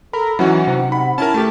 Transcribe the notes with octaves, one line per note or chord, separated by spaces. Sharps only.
A4 A#4 B5
E3 F#3 C#4 D#4 F#4 F#5
C3
B5
C#4 E4 A#4 A5
A3 G4